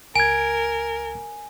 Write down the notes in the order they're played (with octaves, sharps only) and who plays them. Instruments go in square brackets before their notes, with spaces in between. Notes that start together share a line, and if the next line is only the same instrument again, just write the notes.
[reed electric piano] C#2 G#6 [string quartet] A#4 [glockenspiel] G#5